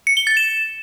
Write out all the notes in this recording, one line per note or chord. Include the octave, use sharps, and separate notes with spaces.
C#7
G7
A6
E7